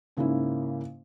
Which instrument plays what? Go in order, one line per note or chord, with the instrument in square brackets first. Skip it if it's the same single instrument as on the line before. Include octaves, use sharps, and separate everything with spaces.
[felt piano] G#2 C#3 A#3 C#4 E4